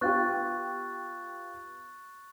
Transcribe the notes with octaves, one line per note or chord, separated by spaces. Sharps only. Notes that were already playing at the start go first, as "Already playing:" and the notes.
B3 F4 G4 C#6 F#6 A6